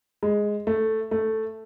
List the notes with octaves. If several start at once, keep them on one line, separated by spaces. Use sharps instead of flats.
G#3
A3
A3